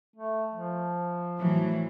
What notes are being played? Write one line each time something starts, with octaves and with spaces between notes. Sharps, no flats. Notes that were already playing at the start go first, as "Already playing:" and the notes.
A3
F3
A2 E3 F#3